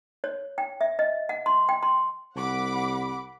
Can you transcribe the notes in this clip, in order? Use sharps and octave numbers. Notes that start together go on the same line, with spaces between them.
C#5
G5
E5
D#5
F#5
C6
G5
C6
C2 F#5 B5 D6